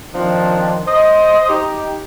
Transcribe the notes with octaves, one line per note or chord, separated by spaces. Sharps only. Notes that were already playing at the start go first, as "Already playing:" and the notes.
D#3 F3 C4 D4
C5 D#5
D#4 G4